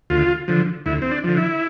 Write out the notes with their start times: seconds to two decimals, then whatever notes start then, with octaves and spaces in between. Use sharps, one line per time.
0.10 D2 F4
0.48 D3 F3
0.86 D2 E4
1.02 C4
1.11 D4
1.24 D3 F3
1.37 E4